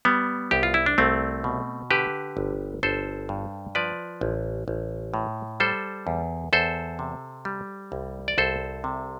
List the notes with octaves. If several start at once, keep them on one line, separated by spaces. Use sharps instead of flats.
G3 B3
C2 G4
F4
E4
D4
C2 A3 C4
B2
D3 G4 B4
G1
G1 A4 C5
G2
F3 B4 D5
A1
A1
A2
G3 A4 C5
E2
E2 A4 C5
C3
G3
C2
D5
C2 A4 C5
C3